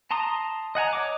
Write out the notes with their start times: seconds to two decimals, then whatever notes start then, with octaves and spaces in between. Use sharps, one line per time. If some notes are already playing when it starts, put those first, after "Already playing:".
0.11 A5 A#5 C6 D#6
0.75 D#5 F#5 G#5 A#5
0.93 C#5 D#5 D6